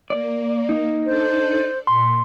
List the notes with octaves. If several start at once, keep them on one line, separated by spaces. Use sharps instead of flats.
A#3 D5
D#4
D4 A4 C5 D5
A#2 C6